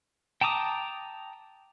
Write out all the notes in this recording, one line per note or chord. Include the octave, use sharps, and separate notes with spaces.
G5 A5 A#5 D6 D#6